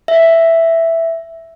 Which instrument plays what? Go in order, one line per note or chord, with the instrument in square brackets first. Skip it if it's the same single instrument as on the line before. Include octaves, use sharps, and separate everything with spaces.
[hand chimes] E5